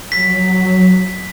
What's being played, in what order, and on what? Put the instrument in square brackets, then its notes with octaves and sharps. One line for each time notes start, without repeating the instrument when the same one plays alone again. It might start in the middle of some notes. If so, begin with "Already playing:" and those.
[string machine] F#3 [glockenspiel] B6